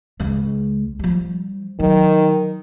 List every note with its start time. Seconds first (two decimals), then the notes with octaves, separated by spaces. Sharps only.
0.20 C#2 G#3
0.99 F3 G3
1.80 D#3 F#3